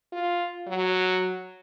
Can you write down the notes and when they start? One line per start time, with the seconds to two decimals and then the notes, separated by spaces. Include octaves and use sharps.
0.13 F4
0.67 F#3